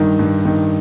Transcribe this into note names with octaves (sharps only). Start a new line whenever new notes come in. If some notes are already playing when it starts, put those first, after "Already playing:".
Already playing: G2 D#3
G2
D#3